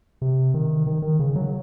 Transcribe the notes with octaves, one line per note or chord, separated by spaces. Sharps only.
C3
D#3
D#3
D#3
C#3
F#3